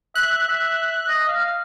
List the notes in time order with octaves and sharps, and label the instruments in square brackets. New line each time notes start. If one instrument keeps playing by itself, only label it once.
[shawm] E5 [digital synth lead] F#6
[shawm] E5
D#5
F5